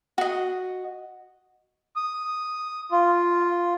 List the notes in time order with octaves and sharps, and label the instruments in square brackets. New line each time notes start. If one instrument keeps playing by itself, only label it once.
[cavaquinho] F#4 D#5
[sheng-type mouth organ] D#6
F4